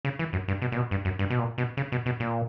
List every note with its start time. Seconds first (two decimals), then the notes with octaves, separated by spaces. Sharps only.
0.05 C#3
0.19 E3
0.33 F#2
0.48 G2
0.62 B2
0.72 A#2
0.76 B2
0.91 G2
1.05 F#2
1.19 G2
1.30 B2
1.39 A#2
1.58 B2
1.77 C#3
1.92 B2
2.06 B2
2.20 A#2